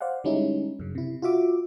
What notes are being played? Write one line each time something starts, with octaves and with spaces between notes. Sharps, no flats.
C5 D5 F5 F#5
D3 G3 G#3 C#4 D#4 E4
F#2 C#3
C3 E4
F4 F#4 E5 D6